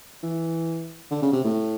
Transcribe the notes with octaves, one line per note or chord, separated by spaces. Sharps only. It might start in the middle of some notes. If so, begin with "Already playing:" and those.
E3
D3
C#3
C3
A2